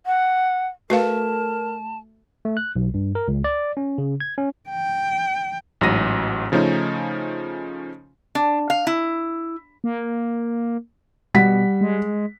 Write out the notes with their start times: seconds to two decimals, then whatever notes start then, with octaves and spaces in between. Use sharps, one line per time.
0.06 F#5
0.90 A3 F#4 A#4 B4 F5 A5
2.45 A3
2.57 F#6
2.76 B1
2.94 G2
3.15 A#4
3.28 C#2
3.44 D5
3.77 C#4
3.98 C#3
4.20 G#6
4.38 C#4
4.70 G5
5.81 A1 G#2 F#3 F#4 A#6 D#7
6.52 C#3 F3 A3 C#4 D#4
8.35 D4
8.70 F5
8.87 E4
9.84 A#3
11.34 B2 G3 F#5 B6
11.81 G#3